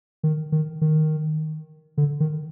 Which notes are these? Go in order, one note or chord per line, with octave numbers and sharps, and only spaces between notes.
D#3
D#3
D#3
D3
D#3